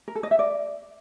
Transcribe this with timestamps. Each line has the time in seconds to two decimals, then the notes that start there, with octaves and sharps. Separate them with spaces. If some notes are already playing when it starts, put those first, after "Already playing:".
0.08 A#4
0.15 A4
0.23 D#5
0.31 E5
0.39 D5